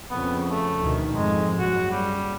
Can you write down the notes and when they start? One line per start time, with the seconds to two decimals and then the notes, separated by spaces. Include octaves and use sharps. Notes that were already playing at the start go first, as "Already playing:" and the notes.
0.10 F2 C#3 B3
0.50 A3
0.80 D2 B2 D#3
1.14 F2 G#2 G#3
1.59 F#1 C#3 F#4
1.91 G3